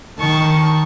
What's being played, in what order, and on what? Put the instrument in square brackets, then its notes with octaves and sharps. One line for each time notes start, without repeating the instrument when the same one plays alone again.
[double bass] D#3 [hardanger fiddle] A5 C#6